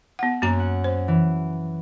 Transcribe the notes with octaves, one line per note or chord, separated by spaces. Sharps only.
B3 F#5
F#2 A#3 F#4 A#5
F#5
C5
E3